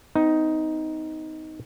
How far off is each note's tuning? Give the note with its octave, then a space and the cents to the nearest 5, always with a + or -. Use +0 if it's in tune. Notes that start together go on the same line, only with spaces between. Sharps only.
C4 -45 D#4 +10